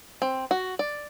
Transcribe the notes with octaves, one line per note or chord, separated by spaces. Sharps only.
C4
F#4
D5